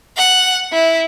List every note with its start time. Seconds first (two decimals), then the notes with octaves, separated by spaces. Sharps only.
0.18 F#5
0.73 E4